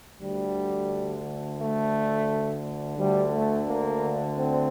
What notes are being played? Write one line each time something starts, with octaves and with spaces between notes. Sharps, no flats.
D2 D3 G3
A3
D2 D3 G3
A3
A#3
C4